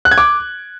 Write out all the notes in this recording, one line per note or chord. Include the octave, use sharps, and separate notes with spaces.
F#6
G#6
D6